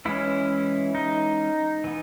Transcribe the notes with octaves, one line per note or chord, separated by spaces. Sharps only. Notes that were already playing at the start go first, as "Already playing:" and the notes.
E3 G#3 C#4 E4
D#4
E3 B3